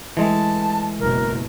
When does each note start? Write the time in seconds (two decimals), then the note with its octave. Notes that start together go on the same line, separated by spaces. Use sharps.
0.17 E3 G#3 A3 A5
1.00 F#1 B2 A#4